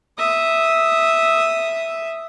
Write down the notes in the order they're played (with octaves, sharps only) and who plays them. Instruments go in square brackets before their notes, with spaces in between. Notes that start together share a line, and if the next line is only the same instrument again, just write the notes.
[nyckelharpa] E5 D#6